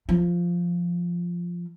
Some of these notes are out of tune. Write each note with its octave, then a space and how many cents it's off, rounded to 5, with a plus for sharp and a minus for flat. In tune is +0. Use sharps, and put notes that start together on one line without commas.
F3 -5